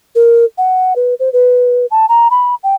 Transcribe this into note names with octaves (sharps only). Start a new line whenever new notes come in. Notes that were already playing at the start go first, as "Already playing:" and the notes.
A#4
F#5
B4
C5
B4
A5
A#5
B5
G5